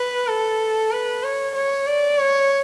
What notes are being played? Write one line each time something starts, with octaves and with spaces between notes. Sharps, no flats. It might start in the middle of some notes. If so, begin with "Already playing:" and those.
Already playing: B4
A4
B4
C#5
C#5
D5
C#5